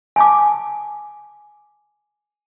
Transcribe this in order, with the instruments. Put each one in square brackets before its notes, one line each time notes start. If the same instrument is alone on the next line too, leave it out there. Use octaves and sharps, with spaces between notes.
[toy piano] G#5 A5 D6